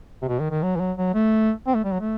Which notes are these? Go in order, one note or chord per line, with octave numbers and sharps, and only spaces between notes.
C3
B2
D#3
D#3
F#3
E3
F#3
F#3
A3
C4
A3
G3
F#3
A3